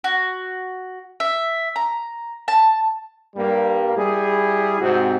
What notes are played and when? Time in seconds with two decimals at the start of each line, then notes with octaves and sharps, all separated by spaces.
0.04 F#4
1.20 E5
1.76 A#5
2.48 A5
3.36 G2 G3 A#3
3.95 G3 E4 G#4
4.80 G#2 C3 C4 F#4